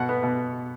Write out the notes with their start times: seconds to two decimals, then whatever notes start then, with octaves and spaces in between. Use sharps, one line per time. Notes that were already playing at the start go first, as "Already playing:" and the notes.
Already playing: B2 F#5
0.09 B3
0.23 B2